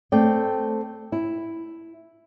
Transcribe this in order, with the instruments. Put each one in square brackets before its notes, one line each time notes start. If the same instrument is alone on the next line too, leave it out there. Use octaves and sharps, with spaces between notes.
[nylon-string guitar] A3 C4 D5 G5
E4